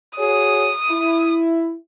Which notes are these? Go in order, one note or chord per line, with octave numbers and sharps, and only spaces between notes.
F#4 G#4 C#5 D#6
E4